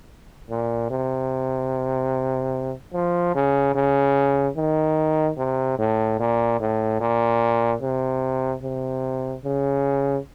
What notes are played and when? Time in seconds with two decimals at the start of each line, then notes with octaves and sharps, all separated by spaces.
0.50 A#2
0.90 C3
2.94 F3
3.35 C#3
3.75 C#3
4.57 D#3
5.38 C3
5.78 A2
6.19 A#2
6.60 A2
7.01 A#2
7.82 C3
8.63 C3
9.45 C#3